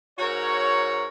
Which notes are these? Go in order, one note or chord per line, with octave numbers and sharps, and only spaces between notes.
G#2 F#4 A#4 C#5